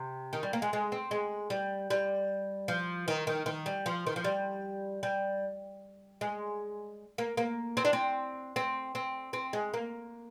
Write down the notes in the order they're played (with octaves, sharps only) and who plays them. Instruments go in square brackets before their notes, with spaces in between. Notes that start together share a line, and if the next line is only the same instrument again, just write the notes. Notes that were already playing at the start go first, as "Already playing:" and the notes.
Already playing: [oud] C3
D#3
G3
A#3
G#3
G#3
C4
G#3
G3
G3
F3
D#3
D#3
D#3
G3
F3
D#3
F3
G3
G3
G#3
A#3
A#3
C4
D4
C4
C4
C4
C4
G#3
A#3